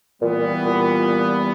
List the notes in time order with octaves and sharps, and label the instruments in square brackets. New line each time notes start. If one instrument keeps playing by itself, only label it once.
[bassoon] A#2 [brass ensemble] E3 G3 B3
[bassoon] A#2